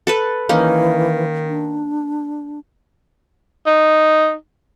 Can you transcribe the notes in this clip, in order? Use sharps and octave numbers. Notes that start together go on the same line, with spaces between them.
A4 B4 A5
D#3 E3 A#3 C#4 D#4
D4
D#4